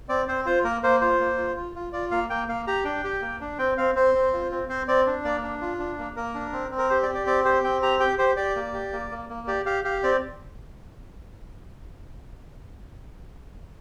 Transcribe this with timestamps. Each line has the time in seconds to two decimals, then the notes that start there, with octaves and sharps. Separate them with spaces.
0.09 C4 D5
0.28 C4 C5
0.46 F4 C5
0.64 A#3 A#4
0.83 A#3 C5
1.01 F4 C5
1.20 A#3
1.37 F4
1.56 F4
1.75 F4
1.93 F4 D5
2.11 A#3 F5
2.30 A#3 G5
2.48 A#3 F5
2.67 G4 A#5
2.85 D4 G5
3.04 G4
3.21 A#3
3.41 D4
3.59 C4 G5
3.78 C4 F5
3.95 C4 C5
4.14 C4
4.33 F4
4.51 C4
4.69 C4 C5
4.88 C4 D5
5.07 D4
5.24 A#3 D5
5.43 D4
5.61 F4
5.79 D4
5.99 A#3
6.16 A#3 A#4
6.34 D4
6.53 C4
6.71 C4
6.78 A#4
6.90 G4 C5
7.03 D5
7.09 G4
7.15 D5
7.26 C4 D5
7.45 G4 C5
7.64 C4 G5
7.82 G4 A#5
8.00 G4 G5
8.18 G4 C5
8.37 G4 D5
8.56 A#3
8.74 G4
8.92 A#3
9.11 A#3
9.30 A#3
9.47 G4 D5
9.66 G4 F5
9.84 G4 F5
10.03 C4 D5